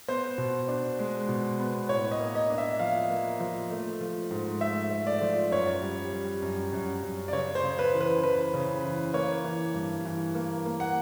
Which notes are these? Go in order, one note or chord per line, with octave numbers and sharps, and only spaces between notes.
B3 C5
B2
D4
G#3
B2
B3
A2 C#5
D#5
A#3
D#5
D4
E5
F3 F5
A#3
F3
A3
F3
G#2
A3 E5
A3
D5
F3
F#2 C#5
G3
G3
F#2
F#2
F#2
D5
C#3 C#5
C5
C#3
B4
E3
B4
E3 B4
C#3
E3
A#3 C#5
E3
G2
E3
A#3
A#3
F#5